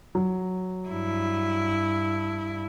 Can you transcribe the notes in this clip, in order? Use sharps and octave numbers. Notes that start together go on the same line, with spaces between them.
F#3
G2 E4